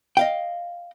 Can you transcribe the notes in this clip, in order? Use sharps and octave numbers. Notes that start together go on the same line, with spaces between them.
D#5 F5 G5